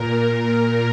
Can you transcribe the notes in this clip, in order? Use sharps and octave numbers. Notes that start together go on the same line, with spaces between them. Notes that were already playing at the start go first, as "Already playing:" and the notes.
Already playing: A#2 A#4
A#4